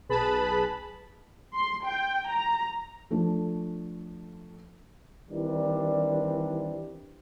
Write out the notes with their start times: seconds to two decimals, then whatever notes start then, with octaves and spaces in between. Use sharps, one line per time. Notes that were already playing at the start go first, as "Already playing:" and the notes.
0.09 B1 G#4 B4 A5 B5
1.54 C6
1.87 G5
2.31 A#5
3.11 F3 A3 D4
5.30 D#3 E3 G3 C4 D4